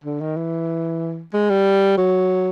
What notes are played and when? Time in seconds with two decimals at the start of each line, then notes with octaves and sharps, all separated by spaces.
0.04 D3
0.20 D#3
0.37 E3
1.33 G#3
1.50 G3
1.98 F#3